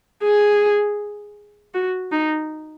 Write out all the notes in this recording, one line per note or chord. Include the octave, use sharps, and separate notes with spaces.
G#4
F#4
D#4